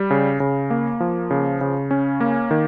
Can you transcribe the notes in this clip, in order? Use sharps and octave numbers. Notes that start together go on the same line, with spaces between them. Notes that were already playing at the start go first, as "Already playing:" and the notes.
Already playing: G3
C#3
C#3
A#3
F3
C#3
C#3
C#4
A#3
D#3